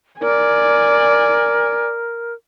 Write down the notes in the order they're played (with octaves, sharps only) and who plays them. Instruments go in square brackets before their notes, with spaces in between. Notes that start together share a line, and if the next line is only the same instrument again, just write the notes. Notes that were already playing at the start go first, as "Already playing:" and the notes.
[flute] A#4 [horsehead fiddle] D5 G#5